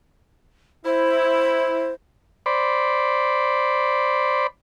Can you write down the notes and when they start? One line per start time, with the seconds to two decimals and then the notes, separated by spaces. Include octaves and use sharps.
0.85 E4 C5
2.46 C5 D5 B5